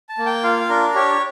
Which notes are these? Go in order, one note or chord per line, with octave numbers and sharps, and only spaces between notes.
A5
A#3
G5
F4 F5
D4 A#4
G4 C#5